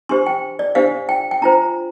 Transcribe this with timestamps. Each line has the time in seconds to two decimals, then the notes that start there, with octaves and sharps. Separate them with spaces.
0.09 D4 G4 C5 C6
0.26 G5
0.59 D5
0.75 D4 G4 C5 F5
1.09 G5
1.31 G5
1.42 D4 F4 C5 A#5